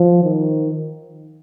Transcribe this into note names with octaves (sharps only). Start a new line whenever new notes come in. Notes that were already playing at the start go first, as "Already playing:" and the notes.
Already playing: F3
D#3